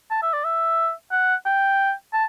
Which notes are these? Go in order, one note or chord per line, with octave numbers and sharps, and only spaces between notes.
A5
E5
D5
E5
F#5
G5
A5